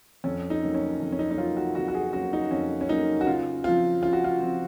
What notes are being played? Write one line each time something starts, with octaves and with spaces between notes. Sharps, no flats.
F2 C#4
D#4
C#3 F#3 A#3
C#4
F2
C#4
D#4
D#4
C#3 F#3 A#3 F4
F#4
F2 F#4
F#4
G#4
C#3 F#3 A#3 F#4
D#4
F2 C#4
C#4
C#3 F#3 A#3 D#4
F#4
C#3 F4
F3 C4 F4
C#3 F4
F#4
F4
F3 C4